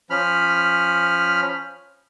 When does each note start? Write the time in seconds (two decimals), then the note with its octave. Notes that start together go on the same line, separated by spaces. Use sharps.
0.10 F3 C#4 B5 F6